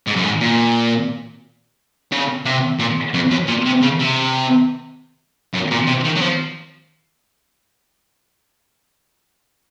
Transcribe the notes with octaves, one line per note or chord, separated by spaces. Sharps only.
G#2
F#2
G#2
A#2
C#3
C3
A#2
F2
F#2
A#2
C3
C#3
C3
F#2
A#2
C3
D#3
F#3
F3